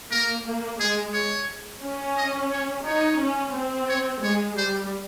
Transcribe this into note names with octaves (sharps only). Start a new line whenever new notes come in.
A#3 A#4
A#3
G#3 G#4
C#5
C#4
D#5
C#5
D#4 C#5
C#4
C4
C#5
G#3 C#5
G3 C5